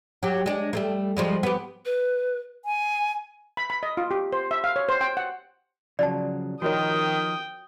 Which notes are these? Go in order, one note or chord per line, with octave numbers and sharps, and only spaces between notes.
F#3 G4
G#3 D4
G3 A3 A#3
F3 G3 G#3
B3 G4
B4
G#5
B5
B5
D#5
F4
G4
C5
E5
F5
C#5
C5
G5
F#5
C#3 F3 F#3 D5 A5
D#3 F3 D#4 F#4 A#4 C#5 G5 D#6